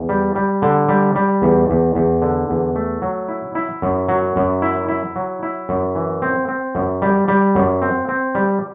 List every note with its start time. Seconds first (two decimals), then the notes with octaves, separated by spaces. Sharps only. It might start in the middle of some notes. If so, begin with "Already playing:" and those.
Already playing: E2
0.09 G3
0.36 G3
0.62 D3
0.89 G3
1.15 G3
1.42 E2
1.70 E2
1.95 E2
2.22 D3
2.50 E2
2.76 A3
3.02 F#3
3.28 E4
3.55 E4
3.82 F#2
4.08 F#3
4.36 F#2
4.62 E4
4.88 E4
5.16 F#3
5.43 E4
5.69 F#2
5.95 E3
6.22 C4
6.48 C4
6.75 F#2
7.02 G3
7.28 G3
7.55 F#2
7.82 C4
8.09 C4
8.35 G3